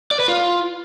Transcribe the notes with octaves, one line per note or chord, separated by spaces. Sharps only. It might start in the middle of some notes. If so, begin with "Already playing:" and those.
D5
B4
F4